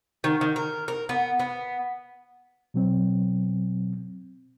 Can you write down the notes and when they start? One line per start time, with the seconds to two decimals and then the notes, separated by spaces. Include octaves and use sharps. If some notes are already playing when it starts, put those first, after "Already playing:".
0.24 D#3
0.41 D#3
0.56 A#4
0.88 A#4
1.09 B3
1.40 B3
2.74 B2 F#3 C4